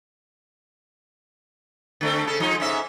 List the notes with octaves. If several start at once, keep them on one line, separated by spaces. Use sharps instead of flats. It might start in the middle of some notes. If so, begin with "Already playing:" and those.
D3 A3 C4
C#3 A4
F3 G#3 D#4
G#2 C#4 E5